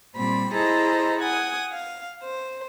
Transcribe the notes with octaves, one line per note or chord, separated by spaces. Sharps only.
A#2 G3 C4 B5
E4 G#4 A4 C5 D#5 A#5
F#5 G#5 D#6
F5
C5